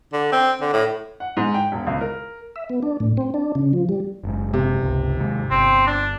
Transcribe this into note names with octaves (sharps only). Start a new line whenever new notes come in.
D3
C4
D3
A2
F#5
G#2
G5
E1
C#2
A#4
E5
B3
D4
A2
C4
D4
C#3
F3
G3
F#1 G#2
C3
G1 C#2
D#2 G#2
G1 C4
D4